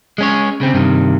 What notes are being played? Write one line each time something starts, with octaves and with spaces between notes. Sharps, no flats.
G#3 C#4 C#5
C#3 C4
G2 C3 D#3